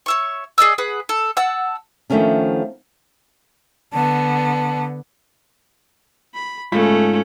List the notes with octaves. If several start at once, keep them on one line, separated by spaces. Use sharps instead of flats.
C#5 E5 C#6
G#4 D5 D#5 E6
G#4 B4 F#5
A4
F#5 A5 E6
D#3 F3 A3 B3 C#4 D4
D3 B3 A5
B5
G#2 A3 C#4 F4 B5